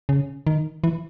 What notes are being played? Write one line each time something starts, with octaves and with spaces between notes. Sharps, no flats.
C#3
D#3
E3